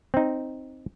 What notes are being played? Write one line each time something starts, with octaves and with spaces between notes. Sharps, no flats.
C4 D#4